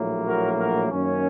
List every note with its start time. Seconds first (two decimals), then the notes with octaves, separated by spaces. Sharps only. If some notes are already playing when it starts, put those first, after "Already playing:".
Already playing: A#1 A2 F#3 A#3
0.25 F#4 A#4
0.58 F#4 A#4
0.91 F#2 D#3 A#3 C#4